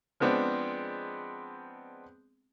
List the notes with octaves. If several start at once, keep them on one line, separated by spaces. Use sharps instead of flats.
F3 G#3 B3 C4 D4